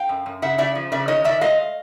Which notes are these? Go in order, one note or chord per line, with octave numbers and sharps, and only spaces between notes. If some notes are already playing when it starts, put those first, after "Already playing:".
Already playing: F5 G5
F#2
F#2
C#3 E5 F#5
C#3 D5 E5
F3
C#3 D5 E5
D#3 C#5 D#5
D#3 D5 E5
G#3 D#5 F5